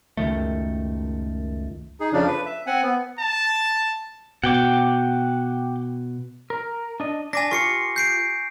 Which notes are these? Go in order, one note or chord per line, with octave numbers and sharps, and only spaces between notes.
C#2 F#2 D#3 A3
D#4 G#4
F2 C#3 F3 D4
B4
E5
C4 F#5 G#5
B3
A5
B2 F#5 G5 D6
A#4
D4 D#5
D4 G#5 D6 A#6
F4 G4 A#4 C#6 C7 C#7
G6 C7 D7